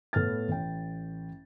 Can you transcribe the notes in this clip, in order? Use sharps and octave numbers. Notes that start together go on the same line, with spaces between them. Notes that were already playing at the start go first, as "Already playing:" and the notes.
A2 B3 F6 A6
A1 G5